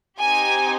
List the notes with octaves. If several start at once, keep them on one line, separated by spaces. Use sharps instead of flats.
C4 D#4 G4 G#5